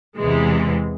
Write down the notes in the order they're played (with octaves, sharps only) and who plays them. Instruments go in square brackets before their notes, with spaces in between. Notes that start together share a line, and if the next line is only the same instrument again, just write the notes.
[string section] E2 C3 E3 G#3